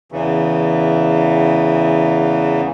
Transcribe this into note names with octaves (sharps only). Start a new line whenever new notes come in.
E2 C#3 E3